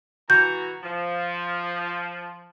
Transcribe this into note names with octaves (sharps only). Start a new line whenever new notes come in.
E3 F#4 A#5 G6
F3